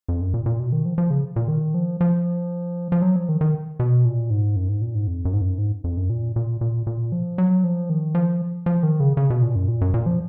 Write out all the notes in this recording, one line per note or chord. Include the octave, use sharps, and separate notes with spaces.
F2
F#2
A#2
A#2
B2
D#3
F3
F3
C#3
A#2
D#3
F3
F3
F3
F#3
F3
D#3
D#3
B2
A#2
G#2
F#2
G#2
A#2
G#2
F2
F#2
G#2
F#2
G#2
F2
F#2
A#2
A#2
A#2
A#2
F3
F#3
F3
D#3
F3
F3
D#3
C#3
C#3
B2
A#2
F#2
A#2
F#2
A#2
F3